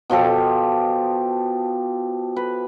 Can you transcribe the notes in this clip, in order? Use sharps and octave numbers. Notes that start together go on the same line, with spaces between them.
B2 F3 G4 A4
B4